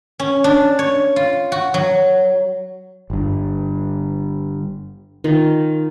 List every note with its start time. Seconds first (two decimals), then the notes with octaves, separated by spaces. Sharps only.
0.19 C#4
0.44 D4
0.79 C#5
1.16 F4
1.52 F#4
1.74 F#3
3.10 G1 G2
5.24 D#3 F4